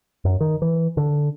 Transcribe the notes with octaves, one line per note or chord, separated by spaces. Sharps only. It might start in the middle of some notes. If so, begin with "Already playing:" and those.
F#2
D#3
E3
D3